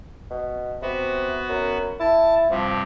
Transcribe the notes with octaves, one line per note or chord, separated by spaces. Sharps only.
B2
C3 B3 F#4
F#2
E4 A5
G2 C3 F3 G3